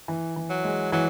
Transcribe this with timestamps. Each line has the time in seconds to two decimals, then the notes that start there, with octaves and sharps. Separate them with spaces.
0.08 E3
0.36 E3
0.50 F#3
0.64 G#3
0.92 E3 F#3